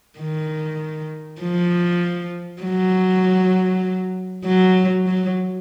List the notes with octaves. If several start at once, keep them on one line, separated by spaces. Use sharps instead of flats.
D#3
F3
F#3
F#3
F#3